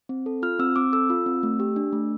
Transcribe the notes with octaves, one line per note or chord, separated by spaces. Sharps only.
C4
A4
F4 F6
C4 E6
C4 D6
A4 E6
F4
C4
A3
G4
D4
A3